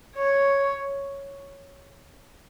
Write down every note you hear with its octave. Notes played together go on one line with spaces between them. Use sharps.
C#5